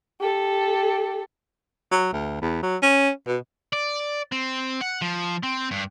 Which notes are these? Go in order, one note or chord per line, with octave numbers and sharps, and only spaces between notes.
G4 A4
F#3
D2
E2
F#3
C#4
B2
D5
C4
F#5
F3
C4
G2